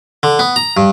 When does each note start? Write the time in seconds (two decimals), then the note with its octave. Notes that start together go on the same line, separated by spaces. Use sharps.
0.23 D3
0.39 B3
0.56 A#5
0.77 G2